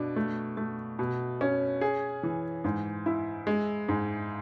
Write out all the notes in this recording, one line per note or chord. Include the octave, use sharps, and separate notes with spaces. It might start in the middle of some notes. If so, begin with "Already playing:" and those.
Already playing: B2 D4
A3
A3
B2
C#4
G#4
E3
G#2
E4
G#3
G#2